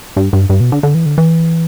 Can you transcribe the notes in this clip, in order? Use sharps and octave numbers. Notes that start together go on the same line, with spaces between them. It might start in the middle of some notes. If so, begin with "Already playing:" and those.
G2
G2
G2
B2
D3
D3
E3
D3
E3